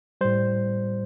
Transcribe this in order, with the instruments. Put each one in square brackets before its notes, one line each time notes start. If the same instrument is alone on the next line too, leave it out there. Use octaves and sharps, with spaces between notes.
[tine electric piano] A2 G3 C5